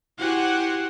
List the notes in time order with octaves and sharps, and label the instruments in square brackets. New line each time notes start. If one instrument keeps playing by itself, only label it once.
[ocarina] E4 [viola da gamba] F#4 G4 C5 [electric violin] F#5 G#5